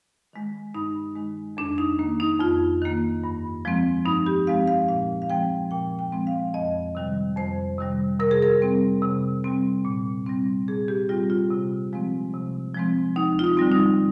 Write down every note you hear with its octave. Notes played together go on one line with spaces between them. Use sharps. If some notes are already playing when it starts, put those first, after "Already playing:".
D#3 G#3
G2 D#4
D#3 G#3
F2 D4
D#4
D#3 A#3
D#4
F2 F4
D#3 A#3
G2
F3 G#3 C4
G2 D#4
G4
F3 G#3 C4 F5
F5
A#2 F5
F5
F3 G#3 C4 G5
A#2 G5
G5
F3 G#3 C4
F5
F2 D#5
C3 D#3 G3
F2 C5
C3 D#3 G3
C3 A#4
G#4
A#4
G3 C4
C3
G3 C4
A#2
G3 C4
A#2 G#4
G4
G3 C4 F4
F4
C3
F3 G#3 C4
C3
F3 G#3 C4
D#2 D#4
F4
D#4
D3 G3 C4
D#4